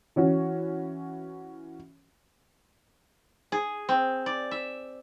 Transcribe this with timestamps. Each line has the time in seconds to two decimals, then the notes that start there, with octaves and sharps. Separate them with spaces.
0.16 E3 C#4 F#4
3.52 G#4
3.89 C4
4.26 D5
4.51 E5